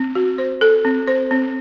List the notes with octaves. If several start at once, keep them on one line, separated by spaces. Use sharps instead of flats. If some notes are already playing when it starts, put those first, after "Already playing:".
Already playing: C4
F#4
C5
A4
C4
C5
C4